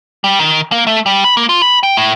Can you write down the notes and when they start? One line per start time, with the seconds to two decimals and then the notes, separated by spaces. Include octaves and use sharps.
0.24 G3
0.39 D#3
0.72 A#3
0.87 A3
1.06 G3
1.24 B5
1.37 A#3
1.49 F4
1.62 B5
1.83 G5
1.97 A2